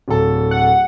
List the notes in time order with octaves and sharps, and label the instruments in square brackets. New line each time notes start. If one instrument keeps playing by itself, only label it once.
[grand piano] D1 A4
[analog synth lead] F#5